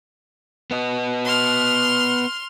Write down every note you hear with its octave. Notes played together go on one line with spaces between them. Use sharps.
B3 D#5
C6 F6